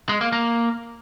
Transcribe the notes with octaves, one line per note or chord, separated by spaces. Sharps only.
G#3
A#3
A#3